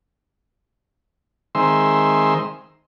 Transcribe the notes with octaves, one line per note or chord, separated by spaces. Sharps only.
D#3 G#3 C4 E5 C6